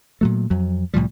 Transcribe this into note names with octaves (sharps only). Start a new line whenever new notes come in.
A#2 F#3 A3
F2 F#3
C2 A2 F3 G3